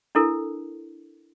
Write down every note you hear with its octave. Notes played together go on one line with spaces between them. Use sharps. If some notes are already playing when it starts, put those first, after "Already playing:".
D4 E4 A4 A#4